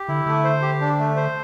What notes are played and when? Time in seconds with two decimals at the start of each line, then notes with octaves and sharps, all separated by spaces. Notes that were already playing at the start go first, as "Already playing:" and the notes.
Already playing: G4
0.08 D3 E4
0.26 D3 A3
0.44 C5
0.62 G4
0.81 D4
0.99 A3
1.16 C5